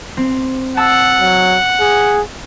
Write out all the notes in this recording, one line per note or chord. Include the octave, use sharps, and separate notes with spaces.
C4
F#5 A5 E6
F#3
G#4